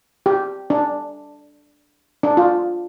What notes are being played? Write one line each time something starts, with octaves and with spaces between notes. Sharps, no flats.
G4
D4
D4
F4